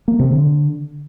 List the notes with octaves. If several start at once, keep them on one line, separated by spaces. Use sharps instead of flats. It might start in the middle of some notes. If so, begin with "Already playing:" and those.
A#3
C3
D3